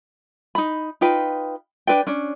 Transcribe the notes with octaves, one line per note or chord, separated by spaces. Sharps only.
D#4 B5
D#4 F4 B4 G5
D4 B4 D5 G5
C#4 D4